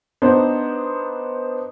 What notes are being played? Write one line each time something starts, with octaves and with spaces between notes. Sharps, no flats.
B3 D4 D#4 C5